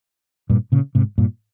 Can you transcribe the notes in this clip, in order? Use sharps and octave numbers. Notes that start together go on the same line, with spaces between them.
G2 A#2
A#2 C#3
G#2 C3
G2 A#2